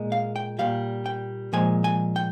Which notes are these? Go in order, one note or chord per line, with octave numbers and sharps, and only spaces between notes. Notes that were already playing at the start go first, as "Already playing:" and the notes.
Already playing: A#2 G#3
F5
G5
A#2 G3 F5
G5
A#2 F3 G#3 G#5
G#5
G5